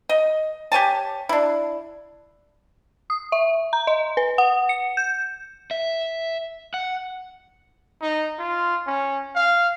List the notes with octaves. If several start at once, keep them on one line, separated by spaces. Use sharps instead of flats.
D#5
G4 C#5 G#5 A5
D4 E4
D#6
E5
A#5
D#5
B4
F#5
C#7
G6
E5
F#5
D#4
F4
C#4
F5